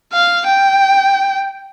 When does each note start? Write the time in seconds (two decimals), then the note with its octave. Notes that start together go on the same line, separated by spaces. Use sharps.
0.13 F5
0.47 G5